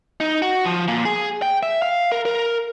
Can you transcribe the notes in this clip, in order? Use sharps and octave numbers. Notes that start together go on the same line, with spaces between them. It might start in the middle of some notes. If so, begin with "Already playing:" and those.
D#4
F#4
F3
A#2
G#4
G5
E5
F5
A#4
A#4